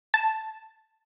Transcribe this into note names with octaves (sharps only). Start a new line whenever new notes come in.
A5